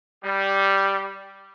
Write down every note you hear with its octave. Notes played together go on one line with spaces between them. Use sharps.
G3